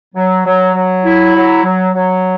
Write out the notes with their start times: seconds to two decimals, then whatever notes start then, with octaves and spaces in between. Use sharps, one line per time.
0.15 F#3
0.46 F#3
0.75 F#3
1.04 E4
1.35 F#3
1.64 F#3
1.94 F#3